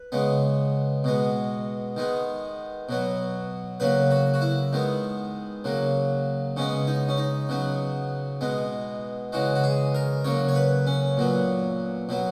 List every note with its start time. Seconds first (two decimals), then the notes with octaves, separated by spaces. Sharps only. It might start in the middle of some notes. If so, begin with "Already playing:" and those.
Already playing: B4
0.12 C#3 G#3 B3
1.04 B2 G#3 B3
1.96 D#3 G#3 B3
2.89 B2 F#3 B3
3.80 C#3 F#3 A#3 B4
4.11 F#4
4.34 F#4
4.41 E4
4.73 D#3 G#3 B3
5.64 C#3 F#3 A#3
6.56 C#3 G#3 B3 C#4
6.87 D#4
7.09 C#4
7.18 D#4
7.49 C#3 F#3 B3
8.41 B2 G#3 B3
9.32 C#3 E3 G#3 F#4
9.55 F#4
9.64 G#4
9.95 A#4
10.24 C#3 F#3 A#3 C#5
10.49 C#5
10.55 B4
10.87 C#4
11.17 A#2 F#3 B3
12.09 B2 F#3 B3